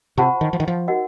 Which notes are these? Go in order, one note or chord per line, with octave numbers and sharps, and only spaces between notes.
C3 F4 C5 F#5 A5 C#6
D#3
F3
D#3
F3
D#4 F#4 A#4 D#5 F#5